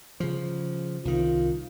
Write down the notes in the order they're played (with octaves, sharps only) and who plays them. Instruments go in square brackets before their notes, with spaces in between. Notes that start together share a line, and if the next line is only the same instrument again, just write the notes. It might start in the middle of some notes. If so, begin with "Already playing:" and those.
[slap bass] C#3 F3
[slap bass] C2 D#3 [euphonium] F4